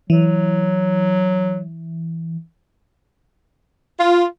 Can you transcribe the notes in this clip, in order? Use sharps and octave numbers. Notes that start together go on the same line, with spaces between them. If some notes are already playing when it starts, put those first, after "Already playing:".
E3 F#3
F4